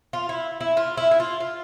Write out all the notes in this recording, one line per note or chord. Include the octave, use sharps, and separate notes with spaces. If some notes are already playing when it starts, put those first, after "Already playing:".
F4
E4
E4
F4
E4
E4
F4
F4